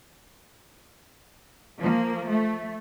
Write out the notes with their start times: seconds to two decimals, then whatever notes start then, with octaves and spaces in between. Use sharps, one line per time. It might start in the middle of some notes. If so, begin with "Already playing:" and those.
1.78 F3 A#3
2.29 A3